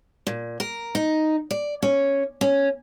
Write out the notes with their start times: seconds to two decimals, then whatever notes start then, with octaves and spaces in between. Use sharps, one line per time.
0.27 A#2
0.60 A#4
0.95 D#4
1.51 D5
1.83 C#4
2.41 C#4